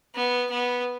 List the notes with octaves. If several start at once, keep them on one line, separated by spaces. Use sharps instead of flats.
B3
B3